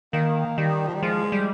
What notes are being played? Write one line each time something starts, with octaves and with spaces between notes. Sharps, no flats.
D#3 A#3
D#3 G3
F3
G3
F3 G#3
G3